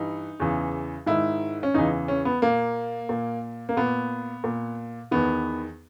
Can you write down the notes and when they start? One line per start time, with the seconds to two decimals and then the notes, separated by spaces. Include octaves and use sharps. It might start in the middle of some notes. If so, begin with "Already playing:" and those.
Already playing: G2 E3 D#4
0.40 E2 C#3 E3
1.06 G#2 D#3 E4
1.63 C#4
1.74 E2 C#3 E3 D#4
2.08 C#4
2.25 B3
2.42 A#2 A#3
3.09 A#2
3.69 A#3
3.77 A#2 B3
4.44 A#2
5.11 E2 D#3 B3